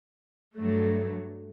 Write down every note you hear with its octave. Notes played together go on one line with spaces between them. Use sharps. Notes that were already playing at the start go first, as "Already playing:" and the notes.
G2 F#3 A3